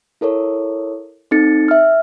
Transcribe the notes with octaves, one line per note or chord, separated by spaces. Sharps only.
E4 A4 A#4 C#5
C4 D#4 A4 A6 C#7
E5 F6